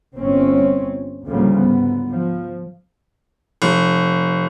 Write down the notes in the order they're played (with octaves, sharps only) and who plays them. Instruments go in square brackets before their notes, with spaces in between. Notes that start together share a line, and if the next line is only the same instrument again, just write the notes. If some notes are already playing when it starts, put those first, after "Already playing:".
[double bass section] G1 C4 C#4
D2 A2 C#3 F3 G3 A#3
G#2 B3
F3
[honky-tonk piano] F1